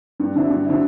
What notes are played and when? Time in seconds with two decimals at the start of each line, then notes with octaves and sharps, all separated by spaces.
0.20 G2
0.36 D3 F#3 C4 E4
0.50 G2
0.65 D3 F#3 C4 E4